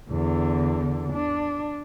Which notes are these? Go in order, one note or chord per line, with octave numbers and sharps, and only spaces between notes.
E2 D3
D4